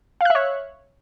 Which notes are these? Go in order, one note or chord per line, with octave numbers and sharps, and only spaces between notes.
C#5 E5 F5 F#6